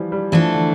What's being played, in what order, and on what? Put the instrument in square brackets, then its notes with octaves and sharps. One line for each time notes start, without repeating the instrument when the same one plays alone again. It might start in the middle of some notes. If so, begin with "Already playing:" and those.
Already playing: [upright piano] E3 F3 G3
G3
[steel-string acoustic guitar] E3 A3 D4 A4 [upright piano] F3
[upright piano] D3